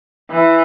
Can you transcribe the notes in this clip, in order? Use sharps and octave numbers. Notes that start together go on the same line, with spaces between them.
E3